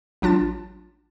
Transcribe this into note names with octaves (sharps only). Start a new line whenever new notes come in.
A1 F#3 D4 F4 A5 A6